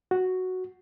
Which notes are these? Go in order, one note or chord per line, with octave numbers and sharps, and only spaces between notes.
F#4